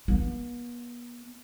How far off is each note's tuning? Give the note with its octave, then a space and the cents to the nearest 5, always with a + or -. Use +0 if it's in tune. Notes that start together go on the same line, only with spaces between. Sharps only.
B3 -40